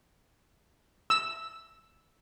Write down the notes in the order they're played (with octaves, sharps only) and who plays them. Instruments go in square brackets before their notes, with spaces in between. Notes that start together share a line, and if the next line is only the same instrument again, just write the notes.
[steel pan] E6